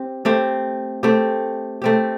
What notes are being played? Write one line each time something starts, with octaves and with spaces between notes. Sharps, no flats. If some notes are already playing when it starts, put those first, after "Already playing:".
Already playing: C4 G4
A3 C4 G4
A3 C4 G4
A3 C4 G4